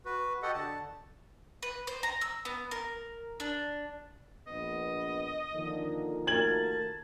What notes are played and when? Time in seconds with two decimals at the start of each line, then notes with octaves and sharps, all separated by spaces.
0.05 F#4 B4
0.42 F#4 G4 A4 D#5 F#5
0.54 D3 A5
1.62 B4
1.87 C5
2.03 A#5
2.21 E6
2.45 B3
2.71 A#4
3.40 D4
4.48 A#1 B3 D#5
5.54 D3 D#3 F3 A#3
6.27 A3 F#4 A#4 A5 G#6 F#7